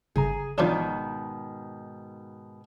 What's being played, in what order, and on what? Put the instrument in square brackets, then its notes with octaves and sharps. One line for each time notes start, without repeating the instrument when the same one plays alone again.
[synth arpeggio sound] G1 C#3 A#5 [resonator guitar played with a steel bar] G#4
[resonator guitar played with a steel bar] G#2 B2 D#3 [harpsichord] F3 D4